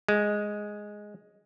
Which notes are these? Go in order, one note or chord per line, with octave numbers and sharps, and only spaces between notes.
G#3